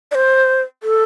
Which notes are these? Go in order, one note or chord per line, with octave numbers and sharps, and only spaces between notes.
D5
C5
A4